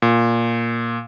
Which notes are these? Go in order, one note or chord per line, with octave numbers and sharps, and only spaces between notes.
A#2